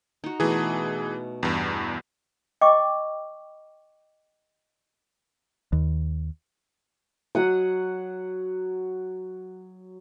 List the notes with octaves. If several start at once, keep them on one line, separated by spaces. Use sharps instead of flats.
D#4 F#4
B2 E3 A3 G#4
E2 G2
D#5 G5 C#6 D6
D#2
F#3 F#5 D#6